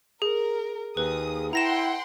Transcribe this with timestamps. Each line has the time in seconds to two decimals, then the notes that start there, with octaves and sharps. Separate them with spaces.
0.22 G#4 A#4
0.97 D#2 G#4 B4 D#6
1.53 E4 F#5 G5 A#5 C6 A#6 E7